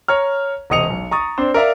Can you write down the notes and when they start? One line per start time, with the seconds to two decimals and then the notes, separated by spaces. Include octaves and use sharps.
0.08 C#5 A#5 F6
0.70 E1 C3 D#5 D#6 C#7 F7
0.90 B1
1.11 A#5 C#6 D#6 A6
1.38 C4 D4 C5
1.54 A#4 D5 E5 F5 A#5